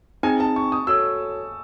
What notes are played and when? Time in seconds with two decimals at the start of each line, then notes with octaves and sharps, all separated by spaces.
0.23 C4 D#4 G#4 G#5
0.40 A5
0.56 C#6
0.72 D#6
0.87 F#4 A4 C#5 E6